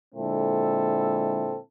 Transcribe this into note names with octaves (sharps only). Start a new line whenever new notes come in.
A#2 D3 G#3 C4 E4 A4